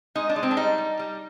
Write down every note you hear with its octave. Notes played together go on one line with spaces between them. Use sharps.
G#3 D#4
D4
G#3
C4
D4
G3 D#4
G3
G3